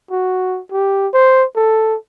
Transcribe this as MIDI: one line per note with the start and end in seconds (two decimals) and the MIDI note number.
0.11 0.60 66
0.72 1.08 67
1.14 1.45 72
1.56 1.96 69